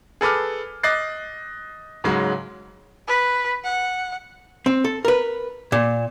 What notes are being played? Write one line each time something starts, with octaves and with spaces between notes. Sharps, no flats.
G#4 A4 B4 D6 F6
D#5 D6 F#6 A6 C7
G#2 C#3 F#3 G#3
B4
F#5
C4
A4
A#4 B4
A#2